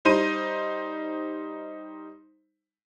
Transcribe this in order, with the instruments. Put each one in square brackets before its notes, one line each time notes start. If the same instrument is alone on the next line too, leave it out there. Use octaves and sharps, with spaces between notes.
[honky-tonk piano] G3 D#4 C5 D#7